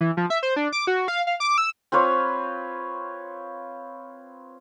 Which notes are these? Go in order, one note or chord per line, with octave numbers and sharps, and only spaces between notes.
E3
F3
E5
C5
D4
D6
F#4
F5
F5
D6
E6
C4 F4 B4 C#5